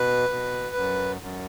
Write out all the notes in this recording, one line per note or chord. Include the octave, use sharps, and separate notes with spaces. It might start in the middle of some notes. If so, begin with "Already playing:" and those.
Already playing: B2 B4
B2
F#2
F#2